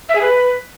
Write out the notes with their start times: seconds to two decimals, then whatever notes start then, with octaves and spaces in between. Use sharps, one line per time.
0.09 E5
0.15 G#4
0.22 B4